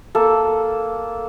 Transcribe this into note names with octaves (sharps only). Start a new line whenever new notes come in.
A#3 A4